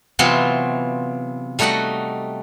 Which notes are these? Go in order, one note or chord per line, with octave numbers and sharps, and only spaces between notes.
C3 E3 F#3 B3 C4 F4
G3 A3 D#4 F#4 D#5 F#5